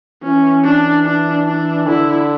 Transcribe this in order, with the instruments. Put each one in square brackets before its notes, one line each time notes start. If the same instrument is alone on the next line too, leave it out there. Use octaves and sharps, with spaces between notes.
[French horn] E3 [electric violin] C#4
[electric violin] D4
D4
D4
[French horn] D3 [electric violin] E4